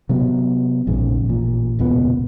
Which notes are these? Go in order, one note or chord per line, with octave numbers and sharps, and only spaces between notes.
C3 F#3 B3
A#1 F2 G#2 C#3
A1 A#2
E1 C#2 A#2 B3